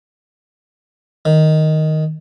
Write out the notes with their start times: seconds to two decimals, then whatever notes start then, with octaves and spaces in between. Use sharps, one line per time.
1.25 D#3